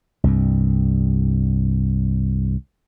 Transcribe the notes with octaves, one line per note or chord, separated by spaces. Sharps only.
C2 G2